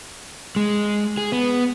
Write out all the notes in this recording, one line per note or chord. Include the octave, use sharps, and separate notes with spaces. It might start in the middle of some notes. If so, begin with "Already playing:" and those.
G#3
G#4
B3